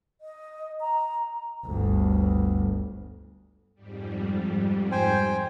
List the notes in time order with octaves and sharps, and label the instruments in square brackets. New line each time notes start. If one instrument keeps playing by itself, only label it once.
[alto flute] D#5
A#5
[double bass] G1 D2
[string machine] F2 G#2 G3
[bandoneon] C5 G5 G#5